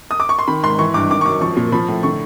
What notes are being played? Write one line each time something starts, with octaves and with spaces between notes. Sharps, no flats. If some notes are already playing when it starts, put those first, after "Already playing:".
D#6
D6
C#6
C6
D#3 B5
G#2 C6
E3 C#6
G2 D6
D#3 D6
C#6
F#2 D6
F3 C#6
A#2
F3 B5
A2
D3 C#6